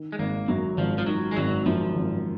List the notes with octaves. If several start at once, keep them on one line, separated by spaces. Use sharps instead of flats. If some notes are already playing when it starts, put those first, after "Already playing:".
Already playing: D#3
G#3
G#1 A#3
F#2 F#3
G#1 F3
F3
D#3 F#3
G#3
G#1 F#3
F#2 F3
G#1